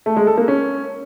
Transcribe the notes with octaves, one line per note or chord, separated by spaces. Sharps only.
A3
G#3
A4
A#3
C#4